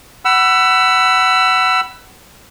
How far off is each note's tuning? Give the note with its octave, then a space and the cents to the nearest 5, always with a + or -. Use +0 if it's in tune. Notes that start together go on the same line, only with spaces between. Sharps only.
F#5 +20 B5 +0 E6 +20